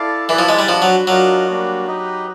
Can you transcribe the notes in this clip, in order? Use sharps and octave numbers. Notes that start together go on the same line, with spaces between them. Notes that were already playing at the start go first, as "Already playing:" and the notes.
Already playing: E4 A4 D5 F5
E3 E4 G#4 B4 D5
F3
G#3
G3
F3 D4 F#4 B4
F#3
F#3 D4 F4 A#4 D#5
G3 A#3 D4 F#4
D#4 G4 B4 D#5